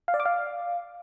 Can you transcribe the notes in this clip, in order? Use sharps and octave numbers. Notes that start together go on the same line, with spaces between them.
F5
D5
D6
F5